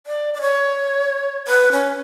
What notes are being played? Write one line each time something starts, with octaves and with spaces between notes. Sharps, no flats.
D5
D5
C#5
B4
C#4